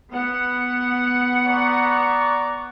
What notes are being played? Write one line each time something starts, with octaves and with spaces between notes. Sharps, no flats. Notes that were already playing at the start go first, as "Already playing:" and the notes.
B3 F#5
D5 A#5 C#6